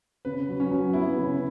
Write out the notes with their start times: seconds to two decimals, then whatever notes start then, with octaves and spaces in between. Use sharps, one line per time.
0.25 C#3 B4
0.49 F#3
0.60 C#4
0.71 F#3
0.94 B3 E4
1.17 C#3